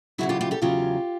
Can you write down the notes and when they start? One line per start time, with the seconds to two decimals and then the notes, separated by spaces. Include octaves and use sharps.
0.18 E2 C#3 F#3 E4 F#4
0.29 F4 G4
0.41 F4 G4
0.51 G4 A4
0.62 E2 C#3 F#3 F4 G4